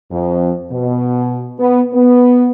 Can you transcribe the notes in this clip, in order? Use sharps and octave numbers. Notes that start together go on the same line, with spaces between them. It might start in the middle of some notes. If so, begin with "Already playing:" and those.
F2
B2
B3
B3